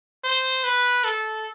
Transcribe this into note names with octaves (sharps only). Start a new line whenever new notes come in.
C5
B4
A4